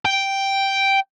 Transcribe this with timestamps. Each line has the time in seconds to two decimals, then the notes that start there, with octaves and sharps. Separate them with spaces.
0.05 G5